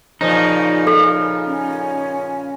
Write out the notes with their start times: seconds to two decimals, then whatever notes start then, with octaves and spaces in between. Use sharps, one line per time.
0.21 A#2 C#3 F3 D#4
0.87 A4
1.46 C#4